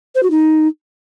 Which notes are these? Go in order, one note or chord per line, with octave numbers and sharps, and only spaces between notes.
C5
F#4
D#4